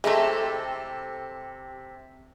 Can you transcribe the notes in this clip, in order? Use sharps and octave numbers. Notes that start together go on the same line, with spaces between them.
C3 G#3 A3 C4 E4 G4 A4 A#5